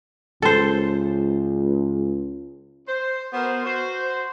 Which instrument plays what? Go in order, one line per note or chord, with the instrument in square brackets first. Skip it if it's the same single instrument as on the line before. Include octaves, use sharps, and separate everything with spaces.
[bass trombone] C#2 [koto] A4 C5
[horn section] C5
B3 F#4 A#4 C5
F#4 C5